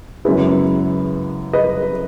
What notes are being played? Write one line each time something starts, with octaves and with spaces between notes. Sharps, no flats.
F#2 C#3 G#3 B3 E4 G#4 B4
B4 D#5